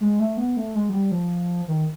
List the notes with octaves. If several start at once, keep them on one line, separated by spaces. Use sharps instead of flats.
G#3
A3
B3
A3
G#3
F#3
G3
F3
D#3